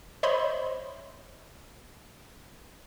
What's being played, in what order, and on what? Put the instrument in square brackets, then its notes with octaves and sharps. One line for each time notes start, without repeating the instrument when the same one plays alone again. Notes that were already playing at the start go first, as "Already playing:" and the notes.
[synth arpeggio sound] C5 C#5 D#5 E5 B5 C6